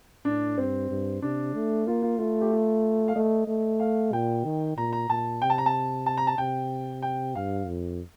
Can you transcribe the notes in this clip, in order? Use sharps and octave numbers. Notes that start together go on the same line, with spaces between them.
A2 D4
G2 C4
G2
C3 D4
A3
A#3 F4
F4
A3 F4
G4
F4
F5
A3 D#5
A3
F5
A#2 G5
D#3
A#2 A#5
A#5
A#2 A5
C3 G5
A5
A#5
A5
A5
A#5
A5
C3 G5
G5
G2 F5
F2